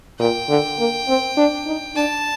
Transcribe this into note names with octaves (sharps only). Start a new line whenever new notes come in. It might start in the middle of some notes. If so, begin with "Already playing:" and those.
A#2 G5
D3
A#3
C4
D4
D#4
D4 A5